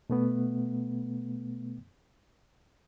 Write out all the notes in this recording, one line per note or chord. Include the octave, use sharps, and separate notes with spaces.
B2 A3 B3